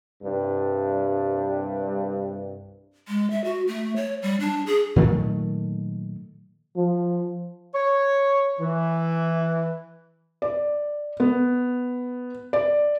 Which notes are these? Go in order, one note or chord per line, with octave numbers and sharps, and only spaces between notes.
C2 G2
G#3
E5
F#4
A3
C#5
G3
D4
G#4
A#2 D#3 F#3 A3
F3
C#5
E3
D5
B3
D5